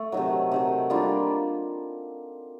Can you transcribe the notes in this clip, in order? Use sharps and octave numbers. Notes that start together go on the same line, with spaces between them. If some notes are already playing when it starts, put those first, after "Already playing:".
Already playing: A3
C3 D#3 F#3
C3 D#3 F#3
G3 A#3 D4 F4